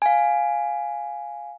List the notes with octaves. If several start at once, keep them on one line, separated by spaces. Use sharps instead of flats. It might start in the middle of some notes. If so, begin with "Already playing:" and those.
F5 G#5